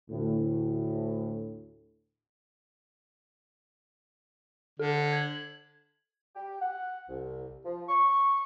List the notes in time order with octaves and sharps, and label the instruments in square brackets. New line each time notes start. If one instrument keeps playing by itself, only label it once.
[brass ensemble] D2 A2
[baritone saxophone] D3 [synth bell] A4
[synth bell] G#6 F#7
[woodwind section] G4
F#5
C2
F3
C#6